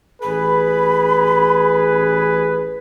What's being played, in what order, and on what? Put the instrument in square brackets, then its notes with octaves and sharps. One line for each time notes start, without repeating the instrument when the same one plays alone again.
[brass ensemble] A1 G#4 B4 [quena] B5